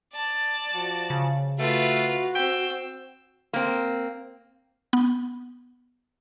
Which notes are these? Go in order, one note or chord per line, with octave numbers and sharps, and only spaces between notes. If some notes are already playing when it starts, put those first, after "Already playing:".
D5 A5
F3 F#4
C#3
A3 F4 F#4 B4
C4 G5 E6
A#3 C4
B3